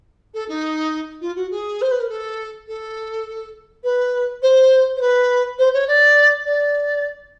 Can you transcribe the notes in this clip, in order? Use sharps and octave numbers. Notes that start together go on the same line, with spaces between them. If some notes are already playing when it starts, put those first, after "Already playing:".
A4
D#4
F4
F#4
G#4
C5
B4
A#4
A4
A4
B4
C5
C5
B4
C5
C#5
D5
D5